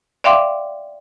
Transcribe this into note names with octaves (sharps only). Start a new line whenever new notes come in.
D5 E5 F5 G5 C6 D6